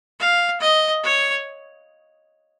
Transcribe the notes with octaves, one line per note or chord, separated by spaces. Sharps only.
F5
D#5
C#5